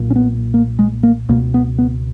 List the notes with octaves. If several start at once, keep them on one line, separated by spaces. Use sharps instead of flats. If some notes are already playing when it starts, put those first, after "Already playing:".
Already playing: B1 A#2
C#4
B3
A#3
G#3
A#3
C#2 B2 A#3
B3
B3